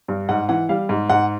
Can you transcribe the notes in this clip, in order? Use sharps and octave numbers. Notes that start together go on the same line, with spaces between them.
G2
G#2 F#5
E3 F#5
G3 F5
G#2
G#2 F#5